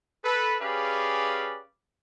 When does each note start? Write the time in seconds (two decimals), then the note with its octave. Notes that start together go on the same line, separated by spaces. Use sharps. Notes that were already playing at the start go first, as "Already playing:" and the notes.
0.24 A4 B4
0.61 C#4 G4 G#4 B4 D5 F5